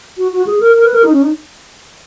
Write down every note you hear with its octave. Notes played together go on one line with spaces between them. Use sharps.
F#4
F#4
G#4
A#4
A#4
B4
A#4
D#4
C#4
D#4